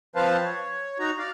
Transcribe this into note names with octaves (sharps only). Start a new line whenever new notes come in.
F3 C4 B4 C5 F5 A5
C#5
D#4 F#4 A#5
D5 F5